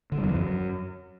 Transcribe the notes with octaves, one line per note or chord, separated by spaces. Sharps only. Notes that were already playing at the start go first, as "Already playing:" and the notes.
D3
G3
E2
F3
F#2